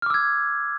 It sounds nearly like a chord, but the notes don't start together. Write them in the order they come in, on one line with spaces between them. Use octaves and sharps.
F6 D6 E6 G#6